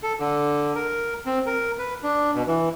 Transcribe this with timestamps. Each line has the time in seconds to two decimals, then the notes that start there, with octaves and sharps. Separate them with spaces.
0.03 A4
0.20 D3
0.75 A#4
1.26 C4
1.46 A#4
1.78 B4
2.03 D4
2.34 B2
2.46 E3